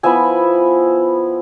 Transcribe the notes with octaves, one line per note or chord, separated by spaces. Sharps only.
F3 B3 E4 E5 G#5